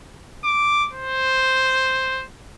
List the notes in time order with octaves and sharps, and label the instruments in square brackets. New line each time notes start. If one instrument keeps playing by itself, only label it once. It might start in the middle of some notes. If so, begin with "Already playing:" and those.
[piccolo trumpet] D6
C5